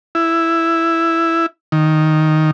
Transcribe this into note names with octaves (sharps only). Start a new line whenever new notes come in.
E4
D#3